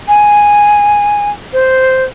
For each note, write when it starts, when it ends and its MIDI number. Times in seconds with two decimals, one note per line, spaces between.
0.08 1.30 80
1.53 2.04 72